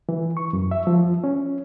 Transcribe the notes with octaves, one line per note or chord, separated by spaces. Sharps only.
E3
C#6
F#2
E5
F3
C#4